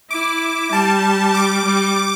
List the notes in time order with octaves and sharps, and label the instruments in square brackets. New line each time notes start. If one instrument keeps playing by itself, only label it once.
[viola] E4 [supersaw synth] D6
[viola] G3 [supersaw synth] A5
[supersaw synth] D6
[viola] G3